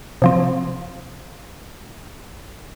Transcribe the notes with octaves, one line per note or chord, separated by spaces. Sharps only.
C3 F3 C4